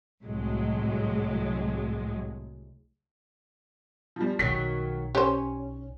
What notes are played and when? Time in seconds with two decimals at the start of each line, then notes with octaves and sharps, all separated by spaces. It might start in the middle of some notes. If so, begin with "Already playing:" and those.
0.23 C2 A2 F#3 G#3
4.16 F3 G3
4.39 B1 D#3 F#3 B6
5.15 C#4 G4 C5